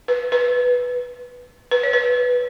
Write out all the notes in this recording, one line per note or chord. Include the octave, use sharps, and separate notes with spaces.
B4
B4
B4
C#5
B4